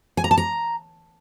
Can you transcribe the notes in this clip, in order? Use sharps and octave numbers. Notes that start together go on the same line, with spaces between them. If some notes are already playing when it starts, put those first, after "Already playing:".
G#5
A#5
A5
A#5